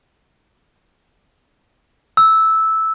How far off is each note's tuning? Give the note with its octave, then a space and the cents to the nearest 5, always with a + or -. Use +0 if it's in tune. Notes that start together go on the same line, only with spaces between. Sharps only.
E6 -10